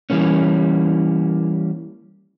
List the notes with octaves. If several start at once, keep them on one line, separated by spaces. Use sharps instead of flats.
E3 G3 A#3 C#4